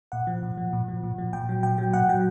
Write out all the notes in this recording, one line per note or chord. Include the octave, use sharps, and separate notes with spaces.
A#2 F#5
F3
A#2
F3
A#2
F3
A#2
F3
A#2 G5
F#3
A#2 G5
F#3
A#2 F#5
F#3 G5